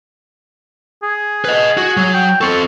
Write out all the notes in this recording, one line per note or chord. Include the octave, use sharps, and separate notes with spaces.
G#4
B4 D#5
F#4
F#3
G5
C4 A4 C#6